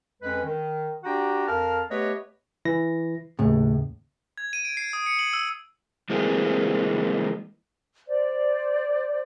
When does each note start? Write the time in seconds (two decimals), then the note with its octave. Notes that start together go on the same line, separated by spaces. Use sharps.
0.22 F2 G#3 C#4 B4
0.44 D#3
1.04 D4 F#4 G4 F#5 G5 A#5
1.48 F2 A#4 F5 A5 F6
1.90 A3 B3 G4 B4 C#5 D#5
2.65 E3 E4 A#6
3.39 D#2 A2 C#3
4.38 G#6
4.53 D#7
4.65 D7
4.77 C7
4.93 D#6
5.06 C#7
5.19 F#7
5.33 E6
6.10 E3 G#3 A#3 C4
8.07 C5 D5